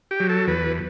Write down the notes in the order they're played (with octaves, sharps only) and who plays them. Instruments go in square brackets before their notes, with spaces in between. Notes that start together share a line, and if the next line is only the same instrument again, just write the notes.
[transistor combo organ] G4
F#3
A4
E2 B4